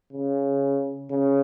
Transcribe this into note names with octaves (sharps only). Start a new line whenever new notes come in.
C#3
C#3